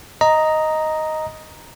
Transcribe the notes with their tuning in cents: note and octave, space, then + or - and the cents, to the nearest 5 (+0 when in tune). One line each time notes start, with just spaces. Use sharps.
D#5 +5 A#5 +0